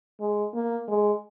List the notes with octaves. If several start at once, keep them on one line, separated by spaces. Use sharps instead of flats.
G#3
A#3
G#3